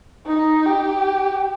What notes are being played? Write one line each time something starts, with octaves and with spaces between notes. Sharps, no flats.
D#4
G4